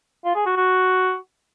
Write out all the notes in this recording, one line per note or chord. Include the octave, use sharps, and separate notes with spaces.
F4
G#4
F#4
F#4